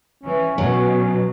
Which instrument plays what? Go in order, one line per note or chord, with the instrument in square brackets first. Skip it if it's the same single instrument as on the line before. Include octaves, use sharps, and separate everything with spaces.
[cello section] E3 [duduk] C#4
[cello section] B2 [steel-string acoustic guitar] F#3